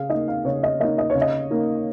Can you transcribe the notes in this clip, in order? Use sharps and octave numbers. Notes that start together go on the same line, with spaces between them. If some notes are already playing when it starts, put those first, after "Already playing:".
Already playing: C#3 G#4 F5
A#3 D#4 D#5
F5
C#3 C#5
D#5
A#3 D#4 D#5
D#5
C#5
C#3
D#5
A#3 D#4